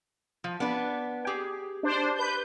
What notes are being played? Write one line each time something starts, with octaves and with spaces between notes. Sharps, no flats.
F3
B3 D4 B4
G4 G#4
D4 C5
B4 G6